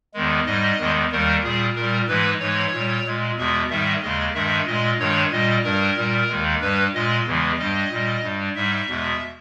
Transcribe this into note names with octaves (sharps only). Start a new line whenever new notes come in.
E2 D#3 G#3
G#2 G3 D#5
E2 D#3 G#3
D#2 D#3 G3 A#4
A#2 G3 G#4
A#2 G3 A#4
G#2 E3 G#3 B4
G#2 E3 G#3 C#5
A#2 G3
A#2 G#3
E2 B2 G#3 E5
G#2 D#3 G3 E5
D#2 C#3 G#3 D#5
G2 D#3 G#3 E5
A#2 G#3 D#5
G2 D#3 G#3 C#5
A#2 G3 D#5
G2 G3 A#4
A#2 G3
D#2 D#3 G#3
G2 G3 B4
A#2 G#3 D#5
E2 C#3 E3 G#3
G2 G3 D#5
A#2 G3
G2 G3
G#2 G3 E5
E2 B2 G#3